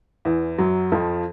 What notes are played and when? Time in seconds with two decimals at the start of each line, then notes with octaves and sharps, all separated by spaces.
0.25 E2 E3
0.58 F#2 F#3
0.92 F2 F3